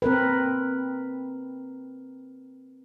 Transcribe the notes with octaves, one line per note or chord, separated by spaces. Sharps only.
C4 A#4 B4